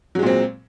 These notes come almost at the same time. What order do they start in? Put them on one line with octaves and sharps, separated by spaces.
F#3 G#3 A#2 C4